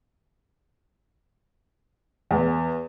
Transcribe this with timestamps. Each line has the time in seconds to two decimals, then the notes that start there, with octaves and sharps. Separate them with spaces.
2.31 E2